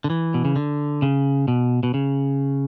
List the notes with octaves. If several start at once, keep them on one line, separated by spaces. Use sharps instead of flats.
D3
E3
B2
C#3
D3
C#3
B2
B2
C#3